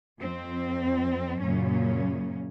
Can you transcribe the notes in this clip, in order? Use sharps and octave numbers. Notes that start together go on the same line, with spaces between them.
F2 C4
F#2 A#2 C#3 C#4